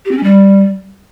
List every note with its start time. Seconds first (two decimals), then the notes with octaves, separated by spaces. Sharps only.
0.05 G4
0.11 C4
0.17 C#4
0.23 G3